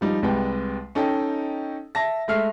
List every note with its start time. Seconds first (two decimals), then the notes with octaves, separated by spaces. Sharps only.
0.01 F3 G3 D#4
0.23 C2 G3 G#3 B4 G5
0.95 C#4 D#4 A4 D#5 G5
1.95 E5 A5 A#6
2.28 G#3 A3 E5 F6 C7